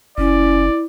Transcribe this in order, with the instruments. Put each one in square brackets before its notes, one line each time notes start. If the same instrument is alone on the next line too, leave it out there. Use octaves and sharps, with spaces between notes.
[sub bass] F#1 [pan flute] C#4 [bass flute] E4 [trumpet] D5